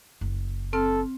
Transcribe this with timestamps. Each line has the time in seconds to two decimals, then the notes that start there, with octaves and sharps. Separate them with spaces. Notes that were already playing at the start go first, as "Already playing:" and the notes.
0.21 F#1
0.73 C4 A4 F6